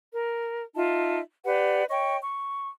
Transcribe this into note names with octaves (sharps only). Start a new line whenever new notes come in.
A#4
D#4 F4 E5 A5
G4 B4 D5 F#5
C#5 D#5 G5 C#6
C#6